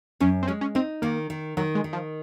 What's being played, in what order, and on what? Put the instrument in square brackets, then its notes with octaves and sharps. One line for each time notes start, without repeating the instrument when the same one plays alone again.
[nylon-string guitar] F#2 [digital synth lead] C#4
[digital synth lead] C4
[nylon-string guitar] G#3 [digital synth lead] C#4
[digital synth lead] C#4
[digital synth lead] C4 [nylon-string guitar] D#4
[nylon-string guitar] D#3 [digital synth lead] A#3
[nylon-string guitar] D#3
[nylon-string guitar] D#3 [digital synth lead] F#3
[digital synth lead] G#3
[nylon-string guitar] D#3
[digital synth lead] F3